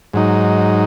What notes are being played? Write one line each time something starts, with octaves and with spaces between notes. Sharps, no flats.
G#2 F#3 D#4